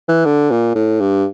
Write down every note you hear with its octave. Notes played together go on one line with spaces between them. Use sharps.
E3
D3
A#2
A2
G2